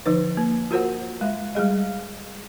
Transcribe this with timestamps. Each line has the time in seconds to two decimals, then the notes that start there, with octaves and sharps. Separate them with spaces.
0.06 D3 F3 D#4 B4
0.37 A#3
0.71 F4 F#4 A#4 C5 F#5
1.21 G#3 E5
1.55 G3 G#3 G#4 D#5